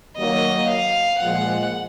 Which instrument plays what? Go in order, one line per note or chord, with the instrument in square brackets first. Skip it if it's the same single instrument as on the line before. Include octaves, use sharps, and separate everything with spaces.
[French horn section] D#3 F#3 A#3 [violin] D#5
[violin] F5
[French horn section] A#2 F3 G#3 [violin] F#5